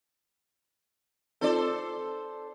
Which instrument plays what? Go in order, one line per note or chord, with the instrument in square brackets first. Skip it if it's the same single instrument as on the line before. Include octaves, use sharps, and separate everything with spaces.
[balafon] C4 D#4 F4 [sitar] A4 C5 D5